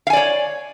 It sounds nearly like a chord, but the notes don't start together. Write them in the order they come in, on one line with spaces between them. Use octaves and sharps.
F5 G#5 D5 C#5